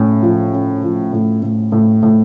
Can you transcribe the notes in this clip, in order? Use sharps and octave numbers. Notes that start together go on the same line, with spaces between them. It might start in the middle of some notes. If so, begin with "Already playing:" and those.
Already playing: A2 C#4
F3
C#4
F3
A2
A2
A2
A2